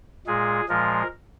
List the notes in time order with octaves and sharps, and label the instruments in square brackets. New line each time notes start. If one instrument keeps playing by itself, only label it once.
[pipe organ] A#2 G#3 G#4
A#2 F3 G#3 A#4